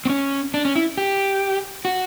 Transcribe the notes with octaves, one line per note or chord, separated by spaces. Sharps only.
C4
C#4
D4
C#4
E4
G4
F#4